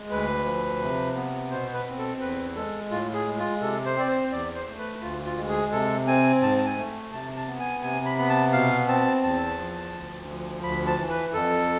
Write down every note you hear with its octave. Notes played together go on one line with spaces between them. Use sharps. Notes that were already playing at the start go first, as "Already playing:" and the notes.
Already playing: G#3
D2 B4
F3
C3
B3
B2 C5
B4
C4
A4
E2 B4
G#3 A4
A2 F4
G#4
G#3
F4
C3 A4
C5
C4 D5
C5
E2 D5
C5
A3
B4
D2 F4
F4
G#3
G#4
C3 A4
C4 G#5
G#2 A5
A5
G#5
A3
C3 A5
A5
B3
G#5
C3 G#5
B5
B3 B5
A5
B2 F5
C4 A5
E2 A5
F3
D2
F3
D2 B5
A5
E3
B4
F2 A4